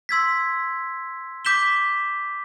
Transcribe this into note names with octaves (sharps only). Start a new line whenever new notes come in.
C6 E6 G#6 B6
D6 G6 B6 E7 G7